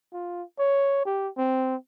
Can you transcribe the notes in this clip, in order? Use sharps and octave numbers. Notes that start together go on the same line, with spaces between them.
F4
C#5
G4
C4